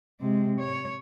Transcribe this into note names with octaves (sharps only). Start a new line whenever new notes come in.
C3 G#3
C#5